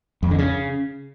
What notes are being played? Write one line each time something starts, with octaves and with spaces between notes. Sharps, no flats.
F2
D3
C#3